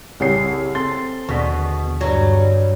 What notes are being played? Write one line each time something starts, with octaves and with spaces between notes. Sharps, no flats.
C2 C#3 G#4 C#5 G5 C7
C4 A4 C6 A6
D#2 B2 D3 G#4 C#6 B6
G2 F#3